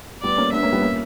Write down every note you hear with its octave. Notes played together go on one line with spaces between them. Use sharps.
G3 B3 D5
A#3 C#4
B3 D4 E5
A#3 C#4
G3 B3
A#3 C#4